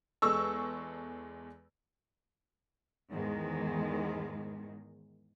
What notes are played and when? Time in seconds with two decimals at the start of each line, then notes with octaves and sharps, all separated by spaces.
0.22 E2 G#3 A4 C#6 E6
3.12 E2 G#2 D#3 G#3